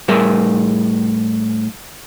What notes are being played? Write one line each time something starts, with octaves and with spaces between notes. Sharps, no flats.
A2 G3 G#4 A#4 E5